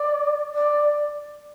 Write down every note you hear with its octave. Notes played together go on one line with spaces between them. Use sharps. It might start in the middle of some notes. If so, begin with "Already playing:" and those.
Already playing: D5
D5